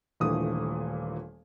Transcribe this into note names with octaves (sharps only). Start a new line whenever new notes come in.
D#1 A#2 D3 E3 A3 D#6